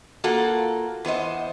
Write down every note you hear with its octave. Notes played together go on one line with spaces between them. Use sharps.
A#3 F4 F#4 A4
E2 B3 C5 D#5